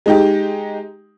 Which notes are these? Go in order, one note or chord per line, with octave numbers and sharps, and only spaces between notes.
G#3 D#4 G4